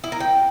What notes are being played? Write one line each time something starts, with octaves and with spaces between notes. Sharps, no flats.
E4
A#4
G5